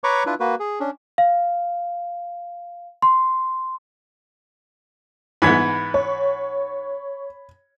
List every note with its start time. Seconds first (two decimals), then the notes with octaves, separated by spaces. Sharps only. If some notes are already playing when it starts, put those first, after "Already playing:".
0.04 B4 C#5 A#5 B5 C#6 D6
0.26 D4 E4 F4 B4
0.40 A#3 F#4 B4
0.60 G#4
0.80 C#4 D4
1.18 F5
3.02 C6
5.42 G#2 E3 B3 B5 G#6 B6
5.94 C#5